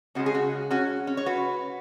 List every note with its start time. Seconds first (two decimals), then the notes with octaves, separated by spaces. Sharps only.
0.15 C#3 G#3 C#4 F#4
0.26 G#4
0.34 C#4 F#4
0.71 C#4 F#4
1.07 C#4
1.17 C#5
1.26 F#4 B4